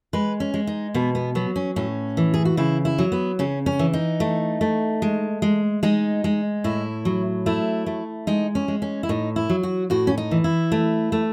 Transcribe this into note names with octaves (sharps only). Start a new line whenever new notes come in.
G#3 B4
C#4
G#3
D#4
B2 B3
B3
F#3 B3
C#4
A2 C#4
E3
G#4
F#4
C#3 E4
E4
F#3
B3
C#3 C#4
C#4
E3
D#4
A3
A3
G#3
G#3
G#3 D#4
G#3
A2 E4
F#3
A3 E4
A3
G#3 D#4
C#4
G#3
C#4
E4
A2 D#4
E4
F#3
F#4
A2 F#4
C#4
D#4
E3
E4
A3
A3